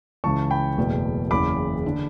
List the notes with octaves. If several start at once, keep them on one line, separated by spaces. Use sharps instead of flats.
C#2 C#3 E3 A5 C#6
G5 B5
F#1 E2 B2 A3
F#1 E2 C#3 E3 B5 D6
D3